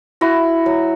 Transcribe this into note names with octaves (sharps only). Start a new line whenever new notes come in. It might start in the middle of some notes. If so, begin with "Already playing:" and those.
E4 F#4
F#3